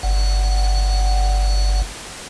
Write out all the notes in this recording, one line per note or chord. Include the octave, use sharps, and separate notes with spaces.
G1 F#5